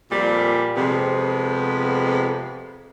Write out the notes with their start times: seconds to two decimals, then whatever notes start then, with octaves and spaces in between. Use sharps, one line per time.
0.11 F2 A#2 G3
0.76 F2 C3 G#3 B3